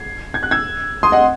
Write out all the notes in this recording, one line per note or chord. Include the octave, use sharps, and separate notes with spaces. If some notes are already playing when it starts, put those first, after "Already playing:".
Already playing: G#6 C7
G#6
F#6
E6 G#6
C6 D#6
D#5 F#5